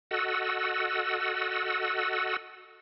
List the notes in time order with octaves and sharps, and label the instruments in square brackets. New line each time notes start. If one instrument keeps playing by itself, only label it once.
[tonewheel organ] F#4 A4 D#5 F#5 E6